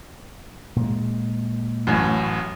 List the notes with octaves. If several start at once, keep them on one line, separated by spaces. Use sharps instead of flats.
A#2 G#3
A1 F#2 A2